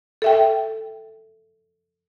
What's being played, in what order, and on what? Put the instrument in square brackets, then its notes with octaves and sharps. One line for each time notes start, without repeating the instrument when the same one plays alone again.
[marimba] A4 E5 G5